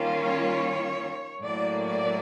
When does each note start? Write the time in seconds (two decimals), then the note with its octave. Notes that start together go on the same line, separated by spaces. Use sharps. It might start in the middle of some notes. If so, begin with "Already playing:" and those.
Already playing: D#3 G3 A#3 C#4 F4
0.23 C#5
1.42 A2 F#3 A#3 D5
1.86 D5